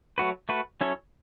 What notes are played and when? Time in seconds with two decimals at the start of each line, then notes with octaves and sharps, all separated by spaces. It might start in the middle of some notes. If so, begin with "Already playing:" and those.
0.18 F#3 A3 F#4 B4
0.49 A3 F#4 B4
0.81 F#3 C#4 E4 A4 C#5